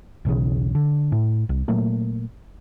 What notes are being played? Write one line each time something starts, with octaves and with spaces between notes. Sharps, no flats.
E1 B1 E2 C#3
D3
A2
C2
A#2 F#3 A3 A#3